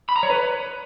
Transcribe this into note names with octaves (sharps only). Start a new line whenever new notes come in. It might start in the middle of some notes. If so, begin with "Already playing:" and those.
B5
A#5
C#5
B4